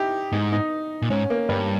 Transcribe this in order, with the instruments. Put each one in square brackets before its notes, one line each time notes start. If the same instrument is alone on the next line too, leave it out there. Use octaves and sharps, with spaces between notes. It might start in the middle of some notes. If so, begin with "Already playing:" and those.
Already playing: [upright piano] D#4 E4 G4
[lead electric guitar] G#2 [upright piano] D#4
[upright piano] D#4
[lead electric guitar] A#2
[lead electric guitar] G#2 [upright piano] C#4
[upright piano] A#3
[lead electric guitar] G2 [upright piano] G3